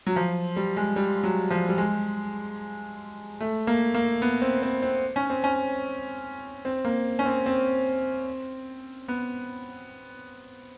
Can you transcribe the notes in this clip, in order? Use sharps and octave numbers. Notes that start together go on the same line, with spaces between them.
F#3
F3
G3
G#3
G3
F#3
F3
G3
G#3
A3
A#3
A#3
B3
C4
C4
C4
C#4
C4
C#4
C4
A#3
C#4
C4
C4
B3